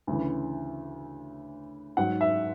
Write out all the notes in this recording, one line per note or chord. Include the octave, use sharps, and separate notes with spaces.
D2 C#3 E3
G#2 F#3 F#5
E5